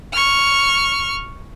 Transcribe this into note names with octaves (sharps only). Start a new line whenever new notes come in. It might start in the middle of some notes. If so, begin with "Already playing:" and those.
C#6 F6